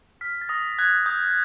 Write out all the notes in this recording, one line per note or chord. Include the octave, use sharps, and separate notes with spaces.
F6 B6
A6
D#6 A#6
F#6 G#6
D#6 G6